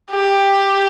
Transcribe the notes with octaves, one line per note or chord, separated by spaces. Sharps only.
G4